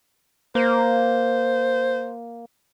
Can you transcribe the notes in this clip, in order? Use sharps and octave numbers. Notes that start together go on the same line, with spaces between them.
A#3 C5